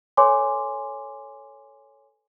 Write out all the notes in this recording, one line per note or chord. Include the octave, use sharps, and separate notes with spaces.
A4 B4 C#5 G#5 C6 D6